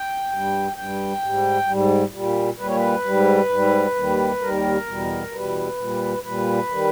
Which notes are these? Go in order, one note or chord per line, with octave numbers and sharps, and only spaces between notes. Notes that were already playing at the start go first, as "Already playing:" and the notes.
Already playing: G5
G2 G3
G2 G3 G5
G#2 G3
G#2 G3
A#2 G3
A#2 G3 B4
C#5
B4
G#2 G3
G#2 G3
D#2 D#3 G3
D#2 D#3 G3 A#4
E2 B2 G3
E2 B2 G3 B4
A#2 G3
A#2 G3 B4
D#3 G3